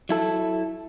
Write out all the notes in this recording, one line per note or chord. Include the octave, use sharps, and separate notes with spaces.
F#3 E4 A4